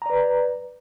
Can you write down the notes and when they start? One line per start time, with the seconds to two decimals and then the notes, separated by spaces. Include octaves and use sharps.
0.02 A#5
0.06 D5
0.10 B4